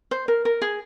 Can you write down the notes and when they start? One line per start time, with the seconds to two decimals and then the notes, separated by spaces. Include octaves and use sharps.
0.11 C5
0.28 A#4
0.45 A#4
0.62 G#4